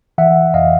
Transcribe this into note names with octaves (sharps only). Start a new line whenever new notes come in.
E3 E5 F#5
F2 D#5 F5